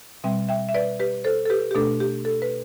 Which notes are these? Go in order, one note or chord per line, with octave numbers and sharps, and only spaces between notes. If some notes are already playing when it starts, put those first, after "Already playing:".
B2 G3 C4 E5 G5
E5 G5
E5
B4 D5
G4 B4
A4 C5
A4
G4 B4
G4
B2 A3 D4 A4
G4
A4
B4